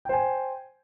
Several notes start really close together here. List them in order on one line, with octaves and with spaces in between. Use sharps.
G5 C5 G#5